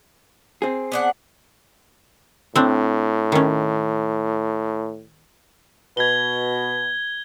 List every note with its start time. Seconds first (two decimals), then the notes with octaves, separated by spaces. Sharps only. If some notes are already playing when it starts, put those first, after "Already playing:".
0.62 C4 G#4
0.92 B3 D4 F#5
2.56 A2 C4 D4
3.32 D#3 C#4
5.97 B2 G#6 G7